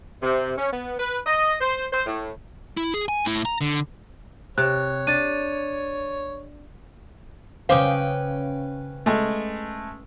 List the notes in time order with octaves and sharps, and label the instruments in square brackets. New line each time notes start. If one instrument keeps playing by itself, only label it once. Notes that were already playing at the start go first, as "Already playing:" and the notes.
[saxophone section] C3
C#4
B3
B4
D#5
C5
C5
A2
[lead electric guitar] E4
G#4
G#5
A2 E4
A#5
D3
[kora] C3 [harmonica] C#5 [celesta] F#6
[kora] D4 [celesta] A6 D#7
[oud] C#3 C5 [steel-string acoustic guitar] C#4 B4 G5 [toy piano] F5 D6 D#6
[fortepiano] G#3 A3